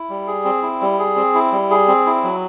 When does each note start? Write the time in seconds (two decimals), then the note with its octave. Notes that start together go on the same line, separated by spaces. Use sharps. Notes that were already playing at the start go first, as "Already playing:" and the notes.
Already playing: E4
0.10 G3
0.27 G#4
0.45 C4
0.62 E4
0.81 G3
0.99 G#4
1.16 C4
1.35 E4
1.52 G3
1.70 G#4
1.88 C4
2.06 E4
2.24 F#3